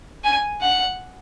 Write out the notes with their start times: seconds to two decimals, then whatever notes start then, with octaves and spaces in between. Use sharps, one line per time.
0.24 G#5
0.61 F#5